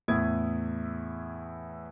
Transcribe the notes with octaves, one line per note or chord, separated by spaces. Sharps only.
E2 A2 E4 D#6 G#6